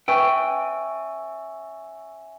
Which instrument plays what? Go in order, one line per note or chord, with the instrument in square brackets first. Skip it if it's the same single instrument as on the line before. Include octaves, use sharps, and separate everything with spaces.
[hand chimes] C#4 E5 G#5 [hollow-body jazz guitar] B4 G5 [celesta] C#6 E6